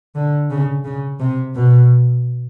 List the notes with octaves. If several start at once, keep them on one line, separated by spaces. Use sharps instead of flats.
D3
C#3
C#3
C3
B2